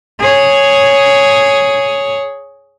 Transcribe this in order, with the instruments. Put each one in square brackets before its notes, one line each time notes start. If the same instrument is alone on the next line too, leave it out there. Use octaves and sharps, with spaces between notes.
[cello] G#4 C#5